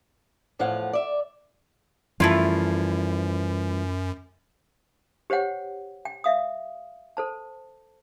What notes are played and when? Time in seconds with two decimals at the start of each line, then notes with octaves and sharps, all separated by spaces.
0.59 E2 A2 F3 F5 F#5
0.93 D5 E5
2.20 F#2 E3 F3 G3 A3 E4 F4
5.30 G4 C5 C#5 F#5 G5
6.05 G5
6.24 E5 F5 D#6
7.17 A4 C5 A5